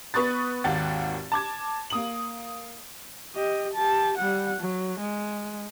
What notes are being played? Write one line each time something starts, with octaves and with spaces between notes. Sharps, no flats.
B3 B4 C#6 D#6 F#6 A6
G#1 D#2 G4 F#5 A6
A5 D6 G#6
A#3 D#6 F#7
G4 D#5
G4 A5
G3 F#5
F#3
G#3